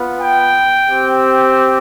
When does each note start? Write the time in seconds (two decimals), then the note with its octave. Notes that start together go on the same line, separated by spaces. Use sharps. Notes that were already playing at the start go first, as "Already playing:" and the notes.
Already playing: B3 F4
0.21 G5
0.88 C4 G4